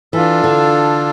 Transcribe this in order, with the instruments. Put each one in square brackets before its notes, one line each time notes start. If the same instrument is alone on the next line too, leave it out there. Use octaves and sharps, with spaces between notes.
[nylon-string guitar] E3 [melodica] D4 F4 A4
[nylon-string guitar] D3